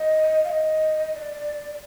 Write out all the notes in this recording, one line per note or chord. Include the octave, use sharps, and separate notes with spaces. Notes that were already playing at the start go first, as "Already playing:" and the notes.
Already playing: D#5
F5
D#5
D#5
D5